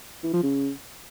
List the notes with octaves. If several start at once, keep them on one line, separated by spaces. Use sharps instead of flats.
E3
F3
C#3